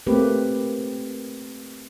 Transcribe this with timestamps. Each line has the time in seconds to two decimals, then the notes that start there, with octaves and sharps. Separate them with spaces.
0.07 A3 A#3 C4 G4 B4